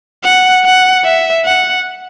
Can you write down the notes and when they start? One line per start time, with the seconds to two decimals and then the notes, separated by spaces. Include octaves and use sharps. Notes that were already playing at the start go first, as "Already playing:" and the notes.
0.24 F#5
0.64 F#5
1.05 E5
1.45 F#5